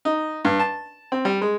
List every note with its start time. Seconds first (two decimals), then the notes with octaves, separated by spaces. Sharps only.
0.05 D#4
0.45 G2
0.60 A5
1.12 C4
1.25 G3
1.42 G#3